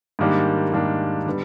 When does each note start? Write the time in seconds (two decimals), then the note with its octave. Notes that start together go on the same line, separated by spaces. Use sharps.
0.19 G#2 D#3 G3 A#3 D4
0.73 G#2 D#3 G3 A#3 D4
1.26 D3 G3 B3